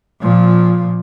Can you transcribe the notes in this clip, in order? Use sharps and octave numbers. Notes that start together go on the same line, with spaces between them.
A#2 F3